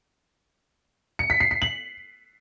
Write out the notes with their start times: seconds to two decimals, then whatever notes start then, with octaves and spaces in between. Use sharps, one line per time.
1.19 C#7
1.30 B6
1.40 C7
1.51 C7
1.62 F#7